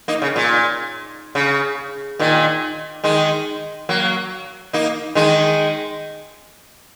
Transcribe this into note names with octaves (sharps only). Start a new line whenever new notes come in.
A#3 D#4
C#3
A#2
C#3
A#2 D#3
D#3 G#3
F#3 A#3
A#3 D#4
D#3 G#3